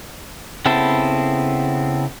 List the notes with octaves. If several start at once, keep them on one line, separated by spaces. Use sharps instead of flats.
C#3 B3 C4 E4 A4